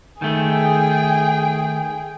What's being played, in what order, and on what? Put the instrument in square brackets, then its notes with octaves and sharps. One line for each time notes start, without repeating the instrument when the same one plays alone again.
[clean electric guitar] D#3 A3 [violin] G#4 G5